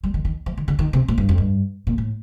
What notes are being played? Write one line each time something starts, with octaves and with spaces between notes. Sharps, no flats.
G3
D#3
D#3
F3
D#3
D3
D#3
C3
A2
G2
F2
G2
A#2
A2